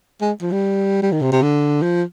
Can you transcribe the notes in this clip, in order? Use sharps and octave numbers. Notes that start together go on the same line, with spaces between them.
G#3
F3
G3
G3
D#3
C3
C3
D3
F3